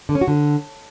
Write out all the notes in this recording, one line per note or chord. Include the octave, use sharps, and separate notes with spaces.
D3
C#4
F#4
D3